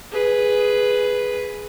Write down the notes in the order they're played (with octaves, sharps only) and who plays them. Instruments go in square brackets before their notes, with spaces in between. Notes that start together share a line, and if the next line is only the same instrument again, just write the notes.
[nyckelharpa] G#4 B4